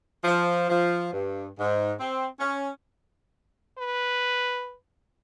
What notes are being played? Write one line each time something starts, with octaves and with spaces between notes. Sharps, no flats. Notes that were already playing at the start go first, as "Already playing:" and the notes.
F3
F3
G2
G#2
C4
C#4
B4